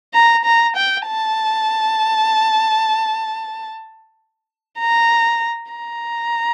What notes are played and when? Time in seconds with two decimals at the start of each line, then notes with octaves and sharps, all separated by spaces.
0.14 A#5
0.45 A#5
0.76 G5
1.07 A5
4.79 A#5
5.72 A#5